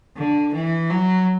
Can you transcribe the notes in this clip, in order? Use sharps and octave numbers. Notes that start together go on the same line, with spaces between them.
D3
E3
F#3